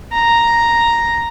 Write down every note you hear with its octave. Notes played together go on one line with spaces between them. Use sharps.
A#5